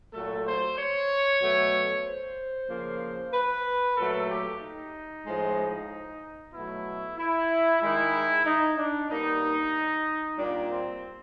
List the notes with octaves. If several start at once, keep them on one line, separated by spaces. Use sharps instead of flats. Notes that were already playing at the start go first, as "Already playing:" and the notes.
A#2 F#3 A3 A4
C5
C#5
B2 F#3 A3
C5
C#3 F3 A#3
B4
A#2 F#3 A3 A4
G4
D#4
A2 F3 G#3
B2 F#3 A3 E4
E4
D#3 G#3 E4
D#4
D4
B2 G3 A#3 D#4
A#2 G3 A#3 D4
C4